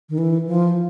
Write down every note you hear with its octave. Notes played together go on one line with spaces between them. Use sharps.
D#3
E3
F3